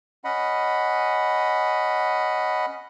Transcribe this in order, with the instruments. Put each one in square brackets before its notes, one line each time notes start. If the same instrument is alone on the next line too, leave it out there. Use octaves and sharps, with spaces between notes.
[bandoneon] C#4 D#5 F#5 B5